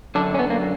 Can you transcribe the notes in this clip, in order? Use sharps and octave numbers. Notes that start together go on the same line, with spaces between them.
F#2 D3 D4
C#4
B3
A#3